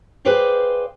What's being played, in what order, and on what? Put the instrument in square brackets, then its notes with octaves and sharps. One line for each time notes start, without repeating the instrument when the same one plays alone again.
[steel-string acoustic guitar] G#4 B4 C5 D5 F5 G5